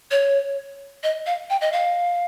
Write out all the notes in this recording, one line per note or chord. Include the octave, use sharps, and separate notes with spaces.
C#5
D#5
F5
G5
D#5
F5